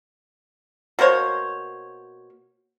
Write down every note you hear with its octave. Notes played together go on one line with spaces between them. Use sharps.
B2 A#3 C5 C#5